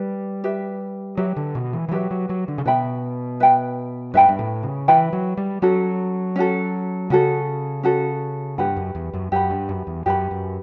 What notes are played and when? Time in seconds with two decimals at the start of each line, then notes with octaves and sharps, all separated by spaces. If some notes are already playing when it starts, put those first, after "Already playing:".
Already playing: G3 G4 B4
0.44 G4 B4 E5
1.17 F#3 G4 B4 E5
1.36 D3
1.55 B2
1.73 E3
1.88 E3
1.91 F#3 G4 B4 E5
2.11 F#3
2.29 F#3
2.48 D3
2.58 C#3
2.65 B2 B4 E5 G5 B5
3.40 B4 E5 G5 B5
4.14 G2 B4 E5 G5 B5
4.29 G2
4.39 A2
4.63 C#3
4.88 E3 B4 E5 G5 B5
5.13 F#3
5.37 G3
5.62 F#3 C#4 F#4 A4
6.36 C#4 F#4 A4
7.10 C#3 C#4 F#4 A4
7.83 C#4 F#4 A4
8.58 G2 G4 B4 F#5 B5
8.77 F#2
8.95 E2
9.14 F#2
9.32 F#2 G4 B4 F#5 B5
9.51 G2
9.69 F#2
9.87 E2
10.06 F#2 G4 B4 F#5 B5
10.31 F#2